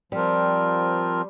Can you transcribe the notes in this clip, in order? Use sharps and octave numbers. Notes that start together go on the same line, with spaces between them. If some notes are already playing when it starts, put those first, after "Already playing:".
F3 G3 C4 F4 A#4